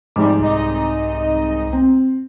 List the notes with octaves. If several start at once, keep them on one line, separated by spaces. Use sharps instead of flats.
G#2 C3 F3 G3 D6
C2 D#4 D#5
C4